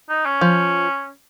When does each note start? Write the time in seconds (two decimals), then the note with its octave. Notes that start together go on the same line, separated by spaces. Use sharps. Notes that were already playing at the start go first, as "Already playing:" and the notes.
0.10 D#4
0.26 C#4
0.41 F3